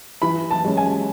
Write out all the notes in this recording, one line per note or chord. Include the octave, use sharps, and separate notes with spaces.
E3 B5
A5
G#3 C#4
G#5